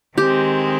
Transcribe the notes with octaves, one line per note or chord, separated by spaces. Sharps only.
D#3 G#3 C4 G4